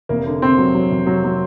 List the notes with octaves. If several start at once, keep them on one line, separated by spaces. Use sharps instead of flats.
F1 A#3
D3
D3 C4
F#3
F#3
F1
F#3
F#3